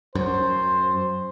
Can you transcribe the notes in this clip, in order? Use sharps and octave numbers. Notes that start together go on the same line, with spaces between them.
F#2 C5